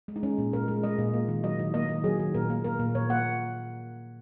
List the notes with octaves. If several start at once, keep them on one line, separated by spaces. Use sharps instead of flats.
G#3
D#4
G#3 C#4
A#2
A#2 A#4
G#3
G#3 D#5
A#2
A#3
D#3
F#3 D#5
D#3
A#3 D#5
D#3
F#3 G#4
D#3
A#2 A#4
A#3
A#3 A#4
A#2
A#2 C#5
A#3 F#5